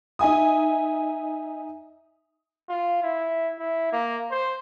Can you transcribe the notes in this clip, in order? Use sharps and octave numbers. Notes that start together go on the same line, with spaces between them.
D#4 E5 G#5 D#6
F4
E4
E4
A#3
C5